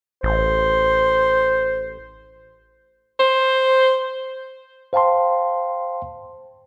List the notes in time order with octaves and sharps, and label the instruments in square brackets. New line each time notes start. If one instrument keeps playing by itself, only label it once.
[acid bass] A1 [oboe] C5
[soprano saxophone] C5
[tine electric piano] C5 F5 G5 A5 C6